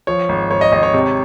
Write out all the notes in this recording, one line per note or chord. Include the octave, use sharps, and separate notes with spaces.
F3 C#5
G#1
G#1 C#5
D#5
G#1 D#5
C#5
C3